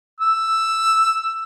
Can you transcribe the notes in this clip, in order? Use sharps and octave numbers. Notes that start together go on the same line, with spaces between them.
E6